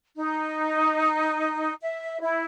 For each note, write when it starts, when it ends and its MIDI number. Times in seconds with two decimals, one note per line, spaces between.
0.16 1.72 63
1.81 2.20 76
2.21 2.45 64